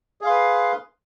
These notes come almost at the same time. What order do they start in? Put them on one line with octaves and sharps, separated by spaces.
G#4 F5 C6 B4